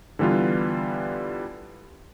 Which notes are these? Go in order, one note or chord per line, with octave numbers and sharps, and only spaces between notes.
D3 E3 G3 B3 F4